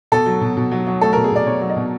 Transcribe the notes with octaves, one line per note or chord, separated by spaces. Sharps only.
B2 A4
F#3
B2
B2
F#3
F#3
A3 A4
A#4
B2
G#4
B2 D5
B2 C#5
F#3
D#5
B2